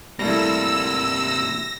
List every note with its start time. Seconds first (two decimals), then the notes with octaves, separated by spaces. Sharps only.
0.19 C3 G3 A3 A#3 E4 E6 A#6